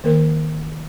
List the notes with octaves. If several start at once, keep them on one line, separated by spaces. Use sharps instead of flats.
D#3 A#3 A#4